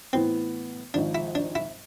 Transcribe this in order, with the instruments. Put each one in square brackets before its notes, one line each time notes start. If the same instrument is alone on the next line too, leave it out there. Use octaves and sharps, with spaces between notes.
[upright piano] A2 E3 B3 E4 B4 [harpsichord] C4
[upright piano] G#1 G#2 F3 [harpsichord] D4
[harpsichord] E4
D4
E4